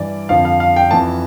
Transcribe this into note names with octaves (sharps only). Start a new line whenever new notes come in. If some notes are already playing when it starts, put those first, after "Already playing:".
Already playing: G2 E3 D5
F2 D3 F3 F5
F5
F5
G5
F2 E3 A5